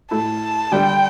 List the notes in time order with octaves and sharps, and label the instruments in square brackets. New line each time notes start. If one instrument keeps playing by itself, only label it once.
[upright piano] A2 A3 E4 [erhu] A5
[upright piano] D3 G3 D4 A4 [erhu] G5